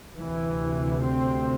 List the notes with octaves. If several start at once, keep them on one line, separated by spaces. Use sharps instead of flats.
D2 C3 E3
C4